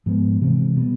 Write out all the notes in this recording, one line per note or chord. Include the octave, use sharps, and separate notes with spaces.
G#2 F3 G#3 B3
C3 E3 G#3 C4
B2 G3 B3